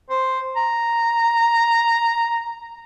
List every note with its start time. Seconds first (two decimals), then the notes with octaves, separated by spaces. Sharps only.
0.10 C5
0.56 A#5